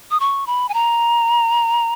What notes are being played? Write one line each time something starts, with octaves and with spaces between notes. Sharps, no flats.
D#6
C#6
B5
G#5
A#5